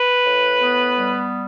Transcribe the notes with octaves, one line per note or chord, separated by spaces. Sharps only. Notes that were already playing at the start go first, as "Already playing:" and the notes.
Already playing: B4
A2
B3
G3